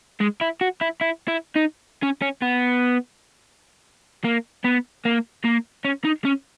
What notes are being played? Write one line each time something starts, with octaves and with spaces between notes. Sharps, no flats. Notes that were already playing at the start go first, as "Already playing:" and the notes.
G#3
E4
F#4
E4
E4
E4
D#4
C#4
C#4
B3
A#3
B3
A#3
A#3
C#4
D#4
C#4